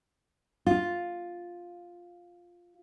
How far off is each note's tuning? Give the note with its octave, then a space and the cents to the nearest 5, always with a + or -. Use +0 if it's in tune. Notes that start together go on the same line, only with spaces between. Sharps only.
F4 +5